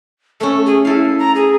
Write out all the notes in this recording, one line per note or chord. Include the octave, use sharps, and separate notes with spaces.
A3 C#4 A4
G#4
E4 A4 F5
A#5
G#4